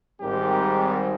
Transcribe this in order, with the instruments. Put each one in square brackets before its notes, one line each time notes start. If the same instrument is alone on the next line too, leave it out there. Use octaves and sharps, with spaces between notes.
[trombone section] G#1 G#2 G3 C4 G4 A#4